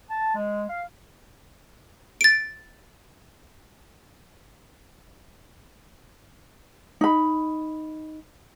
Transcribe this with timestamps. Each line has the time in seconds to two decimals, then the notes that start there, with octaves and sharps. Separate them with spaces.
0.09 A5
0.35 G#3
0.69 F5
2.21 A6 D7
7.01 D#4 B5